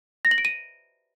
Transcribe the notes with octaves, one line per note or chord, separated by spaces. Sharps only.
A#6
F#7
D7
D#7